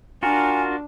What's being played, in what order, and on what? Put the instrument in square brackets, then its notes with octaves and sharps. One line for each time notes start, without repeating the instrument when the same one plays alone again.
[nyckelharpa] D4 [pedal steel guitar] F4 F#4 A#4 [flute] G#5